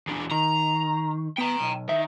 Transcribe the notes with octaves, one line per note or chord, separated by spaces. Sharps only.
E2 D4
D#3 A#5
B3 G5 A#5
B1
D#3 E5